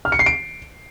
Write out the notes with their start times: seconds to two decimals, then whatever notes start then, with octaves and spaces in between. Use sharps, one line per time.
0.05 F6
0.12 C#7
0.19 C7
0.26 D7